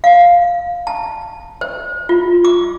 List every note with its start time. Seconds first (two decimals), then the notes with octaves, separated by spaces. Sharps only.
0.04 F5
0.87 A5
1.61 C5
2.09 F4
2.45 D6